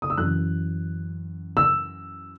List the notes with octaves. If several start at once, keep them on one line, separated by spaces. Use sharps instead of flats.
D#6
E6
F#2 E3 F#6
E6